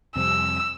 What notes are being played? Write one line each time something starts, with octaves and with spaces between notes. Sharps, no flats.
F2 C3 G3 C4 E6